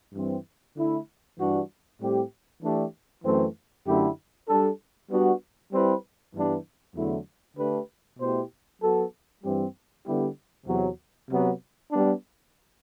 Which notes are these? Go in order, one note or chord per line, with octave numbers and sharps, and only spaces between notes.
G2 E3 G3 C4
D3 A3 E4
G2 E3 G3 D4 F#4
A2 G3 C4 G4
E3 A3 D4 G4
F#2 E3 A3 C4
F#2 D3 A3 E4 G4
G3 D4 A4
G3 B3 D4 F#4
G3 C4 E4 B4
G2 E3 G3 B3 D4
E2 D3 F#3 A3 E4
D3 A3 D4 G4 B4
B2 A3 E4 G4 C5
F#3 B3 F#4 A4
G2 E3 G3 C4 G4
D3 G3 B3 E4 G4
E2 C3 F#3
C3 F#3 B3
G3 B3 D4